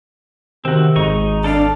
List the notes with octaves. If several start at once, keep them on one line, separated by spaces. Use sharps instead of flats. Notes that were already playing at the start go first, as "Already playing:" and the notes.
C3 D#3 C4 F#4
G#1 G#3 D#4 D#5 C#6
D4 A4 D5 F5